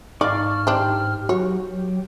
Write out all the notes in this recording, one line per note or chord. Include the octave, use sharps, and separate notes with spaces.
G#2 D#4 D5 F5 A5 C#6 F6
C4 D4 D#4 G4 C5
F#3 F#4 C#5
F#3